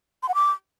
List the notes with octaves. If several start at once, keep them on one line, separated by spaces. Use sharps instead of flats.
C6
F#5
D6